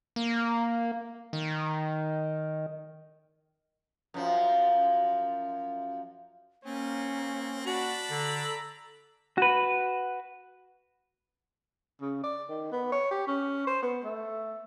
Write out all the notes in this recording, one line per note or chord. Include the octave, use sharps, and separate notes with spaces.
A#3
D#3
F#2 F3
A#3 C4 C#4
D4 F#4 A5 B5
D3 A4 A#5
F#4 B4
C#3
D5
D#3
B3
C#5
G4
C#4
C5
B3
A3